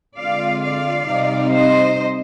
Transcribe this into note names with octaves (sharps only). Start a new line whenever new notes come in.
D3 G#3 C4 F4 D5 F5
D5 F5
C3 G3 C4 D#4
C5 D#5